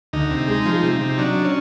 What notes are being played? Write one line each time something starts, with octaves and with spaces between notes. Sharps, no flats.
D2 D#4
C3
G#3
F3
C3
C3
F#3 D4
C#4